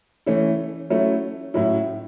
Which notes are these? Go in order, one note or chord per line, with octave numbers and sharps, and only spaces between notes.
E3 A3 C#4 E4
F#3 A3 C#4 E4
A2 F#3 C#4 E4